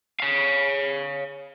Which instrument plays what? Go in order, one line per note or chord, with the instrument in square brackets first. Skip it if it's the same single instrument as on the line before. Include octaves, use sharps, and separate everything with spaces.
[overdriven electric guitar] C#5 F5